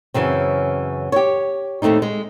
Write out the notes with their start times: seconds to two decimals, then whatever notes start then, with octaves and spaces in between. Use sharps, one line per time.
0.14 F#2 C#3 E3 C4
1.12 G4 C#5
1.82 D#2 A2 A3 C4 D#4
2.02 G#3